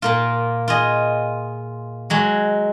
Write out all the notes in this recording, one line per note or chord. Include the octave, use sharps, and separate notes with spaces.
A#2 A#3 F4
F4 G#4 D#5
F#3 G#3 F#4